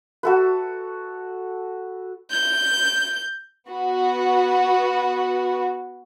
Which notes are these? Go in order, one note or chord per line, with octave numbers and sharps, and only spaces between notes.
F#4 A4 B4
G6
B3 F#4